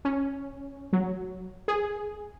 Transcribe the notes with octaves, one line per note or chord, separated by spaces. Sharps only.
C#4
F#3
G#4